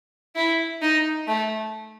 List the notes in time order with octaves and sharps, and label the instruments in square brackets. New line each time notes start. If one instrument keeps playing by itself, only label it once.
[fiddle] E4
D#4
A3